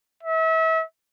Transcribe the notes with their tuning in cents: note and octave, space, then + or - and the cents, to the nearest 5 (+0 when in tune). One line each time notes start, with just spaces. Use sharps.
E5 -35